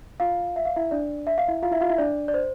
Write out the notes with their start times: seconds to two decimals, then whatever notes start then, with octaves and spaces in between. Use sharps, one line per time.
0.20 F4 F5
0.56 E5
0.65 F5
0.76 E4 E5
0.91 D4 D5
1.27 E5
1.38 F5
1.48 E4 E5
1.62 F4 F5
1.71 E4 E5
1.81 F4 F5
1.89 E4 E5
1.98 D4 D5
2.28 D5
2.34 C5